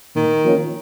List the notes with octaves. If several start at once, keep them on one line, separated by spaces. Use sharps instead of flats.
A#2 D#3
F3 A#3 C#4